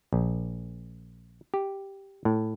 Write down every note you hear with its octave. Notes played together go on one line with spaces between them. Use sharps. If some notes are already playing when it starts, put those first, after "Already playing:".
A#1
G4
A2